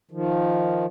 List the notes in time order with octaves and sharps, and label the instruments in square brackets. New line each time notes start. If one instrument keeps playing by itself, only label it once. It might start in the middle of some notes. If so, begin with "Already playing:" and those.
[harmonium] D#3 F3